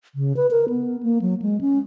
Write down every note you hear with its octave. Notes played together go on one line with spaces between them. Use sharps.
C#3
B4
A#4
B3
A#3
F#3
G#3
C#4